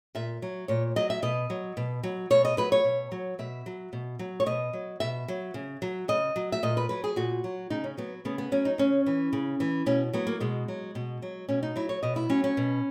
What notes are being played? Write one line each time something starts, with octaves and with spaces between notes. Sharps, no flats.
A#2 E5
F#3
A#2 C#5
F#3 D#5
E5
B2 D#5
F#3
B2
F#3
B2 C#5
D#5
F#3 B4
C#5
B2
F#3
B2 E5
F#3
B2
F#3
C#5
B2 D#5
F#3
B2 E5
F#3
C#3
F#3
C#3 D#5
F#3
E5
A#2 D#5
B4
F#3 B4
G#4
A#2 F#4
F#3
C#3 D#4
C#4
F#3 B3
C#3 B3
B3
F#3 C#4
D#4
C#3 C#4
E3
C#3
E3
B2 C#4
F#3 B3
A#3
B2 G#3
F#3
B2
F#3
B2 C#4
D#4
F#3 E4
C#5
B2 D#5
E4
F#3 C#4
C#4
B2